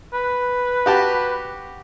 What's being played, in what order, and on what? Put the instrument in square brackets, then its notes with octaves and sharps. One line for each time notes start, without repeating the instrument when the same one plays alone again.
[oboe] B4
[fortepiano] F#4 G4 A5